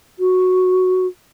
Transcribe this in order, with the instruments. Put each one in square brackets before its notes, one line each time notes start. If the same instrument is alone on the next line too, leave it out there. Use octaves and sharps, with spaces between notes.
[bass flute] F#4